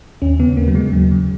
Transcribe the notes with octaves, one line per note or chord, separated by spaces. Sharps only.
D#2 C#4
C#3 B3
D#2 A#3
F#3
C#3 G#3
D#2 F#3
C#3